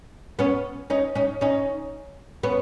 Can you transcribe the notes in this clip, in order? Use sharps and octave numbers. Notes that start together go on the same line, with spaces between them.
B3 C#4
C#4 D#4
C#4 D#4
C#4 D#4
B3 C#4